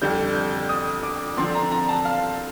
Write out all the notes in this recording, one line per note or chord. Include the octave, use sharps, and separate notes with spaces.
F2 D3 G3 G6
G6
D#6
D6
D3 F3 C4 C6
A#5
A#5
A5
F5